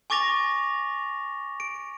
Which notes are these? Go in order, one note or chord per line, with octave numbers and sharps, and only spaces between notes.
G#5 C#6 D6 A6 A#6 F7
D7